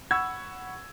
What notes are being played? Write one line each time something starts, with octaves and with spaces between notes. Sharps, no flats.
F#5 B5 C#6 E6 G#6